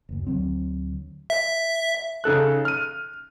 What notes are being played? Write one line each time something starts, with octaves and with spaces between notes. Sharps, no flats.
F#1 D2
D2 D3 F#3 C4
E5
C#3 D#4 A4 F#6
F6 D#7